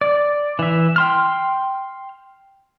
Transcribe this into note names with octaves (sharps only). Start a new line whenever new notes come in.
D5
E3 E5
G5 C6 F6